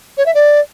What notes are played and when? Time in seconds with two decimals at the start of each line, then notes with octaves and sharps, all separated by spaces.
0.17 C#5
0.26 E5
0.35 D5